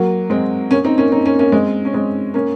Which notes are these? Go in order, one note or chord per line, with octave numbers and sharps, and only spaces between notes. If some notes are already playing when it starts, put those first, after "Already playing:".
Already playing: F#3 A#3
G#3 C4
A#3 C#4
C4 D#4
A#3 C#4
C4 D#4
A#3 C#4
A#3 C#4
G#3 C4
C#4
G#3 C4
A#3 C#4